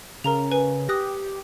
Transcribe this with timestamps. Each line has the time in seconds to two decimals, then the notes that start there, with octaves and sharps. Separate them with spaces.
0.24 C#3 A#4 A#5 F7
0.52 B4 G#5
0.89 G4 D#6 F#6 A#6